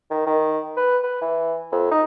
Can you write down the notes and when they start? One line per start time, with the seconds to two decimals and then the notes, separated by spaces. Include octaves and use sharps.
0.10 D#3
0.26 D#3
0.76 B4
1.03 B4
1.21 E3
1.72 F2
1.91 D#4